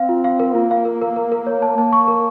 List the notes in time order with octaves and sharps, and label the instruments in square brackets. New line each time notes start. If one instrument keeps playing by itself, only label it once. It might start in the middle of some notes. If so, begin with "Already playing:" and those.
Already playing: [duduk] C4 [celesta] F5
[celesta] F4
F5
A#4
[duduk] A#3 [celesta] F4
[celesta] F5
A#4
A#4
A#4
A#4
C#5
A5
[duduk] A#3 [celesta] A5
[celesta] C#6
A#4